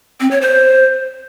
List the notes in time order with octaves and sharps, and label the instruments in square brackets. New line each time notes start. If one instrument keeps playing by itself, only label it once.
[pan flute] C4
C#5
C5